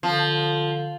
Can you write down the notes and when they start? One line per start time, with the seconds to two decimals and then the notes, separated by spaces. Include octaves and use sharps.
0.03 D3 F3